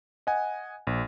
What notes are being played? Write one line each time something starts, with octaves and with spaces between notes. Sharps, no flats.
D#5 F#5 G#5
A#1